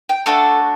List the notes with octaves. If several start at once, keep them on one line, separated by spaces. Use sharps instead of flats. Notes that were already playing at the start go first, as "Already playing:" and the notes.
G5
A3 D4 F#4 A4